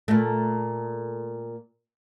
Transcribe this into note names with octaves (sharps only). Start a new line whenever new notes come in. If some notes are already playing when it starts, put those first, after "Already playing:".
A#2 A3